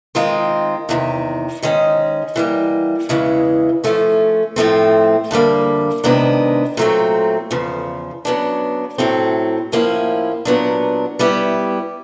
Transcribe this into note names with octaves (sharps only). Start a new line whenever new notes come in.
D#3 G#3 C4 F4
E2 C3 D#3
G#2 D#3 G#3 C#4
E3 G3 A#3
E2 C#3 E3 G#3
F3 A3 C#4
A2 F3 A3 C4
F2 D3 G3 A#3
C3 D#3 G#3 B3 D4
A#2 F#3 A3 C4
E2 C#3 F3
C#3 F#3 B3 D4
A2 F#3 A3 C4
A2 F3 A#3 C#4 E4
A#2 F#3 B3 D4
G3 B3 E4 G4